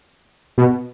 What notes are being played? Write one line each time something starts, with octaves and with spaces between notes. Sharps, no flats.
B2